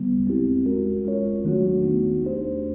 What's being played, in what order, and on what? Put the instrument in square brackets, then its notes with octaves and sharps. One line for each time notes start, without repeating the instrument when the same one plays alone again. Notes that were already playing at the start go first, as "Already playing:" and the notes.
Already playing: [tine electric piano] D3 G3 B3
G#3 C4 E4 G4
G#3 C#4 F#4 A#4
G#3 C#4 F4 A#4 C#5
D#3 F#3 A3 D4 F#4
B3 D#4 F#4
A3 D4 G4 C5